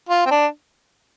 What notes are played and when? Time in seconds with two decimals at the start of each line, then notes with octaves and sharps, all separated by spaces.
0.09 F4
0.26 C4
0.31 D4